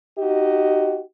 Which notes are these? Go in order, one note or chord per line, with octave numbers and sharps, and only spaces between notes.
D#4 F#4 G4 D#5